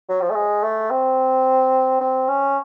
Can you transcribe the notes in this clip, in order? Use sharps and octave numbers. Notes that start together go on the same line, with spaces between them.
F#3
F3
A3
G#3
A3
C4
C4
C#4